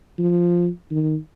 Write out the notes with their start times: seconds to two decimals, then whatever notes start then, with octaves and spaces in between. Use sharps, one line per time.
0.19 F3
0.91 D#3